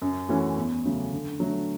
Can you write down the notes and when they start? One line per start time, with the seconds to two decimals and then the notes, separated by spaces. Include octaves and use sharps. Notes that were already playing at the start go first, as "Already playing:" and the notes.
0.02 F#2
0.29 E3 A3 C#4 F#4
0.57 E2
0.85 C#3 F#3 A3
1.13 D3
1.40 F#3 A3 D4